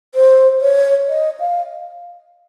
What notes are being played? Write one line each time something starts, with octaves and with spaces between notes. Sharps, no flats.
C5
C#5
D#5
F5